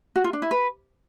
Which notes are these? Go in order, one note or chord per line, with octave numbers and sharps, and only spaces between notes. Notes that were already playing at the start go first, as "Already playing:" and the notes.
F#4
F4
D4
E4
B4